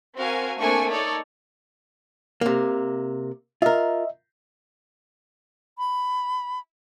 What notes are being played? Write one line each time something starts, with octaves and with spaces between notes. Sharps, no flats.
C4 F#4 A#4 F5 G#5
A3 A#3 C4 D4 G#5 C#6
D#4 A4 C#5 D5
C3 A#3
F4 A#4 D#5 E5
B5